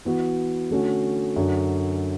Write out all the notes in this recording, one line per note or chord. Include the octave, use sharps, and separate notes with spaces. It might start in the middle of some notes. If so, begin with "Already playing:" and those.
E3 B3 F#4
D3 A3 C#4 F#4
F#2 D3 F#3